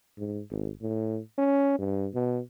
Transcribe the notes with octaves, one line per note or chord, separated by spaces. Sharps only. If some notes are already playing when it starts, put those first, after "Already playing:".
G#2
G#1
A2
C#4
G2
B2